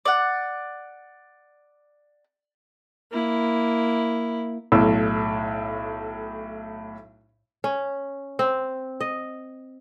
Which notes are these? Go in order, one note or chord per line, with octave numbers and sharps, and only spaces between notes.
D5 F#5
A#3 E4
B1 A2 E6
C#4
C4
D#5